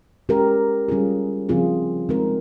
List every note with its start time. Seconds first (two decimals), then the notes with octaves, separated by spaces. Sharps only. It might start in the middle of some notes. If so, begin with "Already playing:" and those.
0.29 G#3 C#4 G4 A#4
0.88 G3 C#4 F4 G#4
1.49 C#3 F3 C4 F4 G#4
2.09 G#3 C4 D#4 A#4